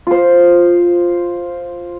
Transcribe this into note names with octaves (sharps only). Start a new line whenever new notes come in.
F4 C5